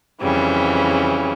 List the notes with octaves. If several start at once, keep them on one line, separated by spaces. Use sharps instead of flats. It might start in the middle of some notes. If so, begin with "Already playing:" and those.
F2 C#3 E3 G3